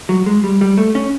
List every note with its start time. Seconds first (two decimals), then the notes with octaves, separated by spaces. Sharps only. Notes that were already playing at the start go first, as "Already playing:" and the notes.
0.09 F#3
0.26 G#3
0.44 G3
0.61 G3
0.78 A3
0.95 C#4